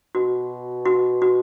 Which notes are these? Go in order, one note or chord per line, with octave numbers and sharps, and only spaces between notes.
B2 F#4
F#4
F#4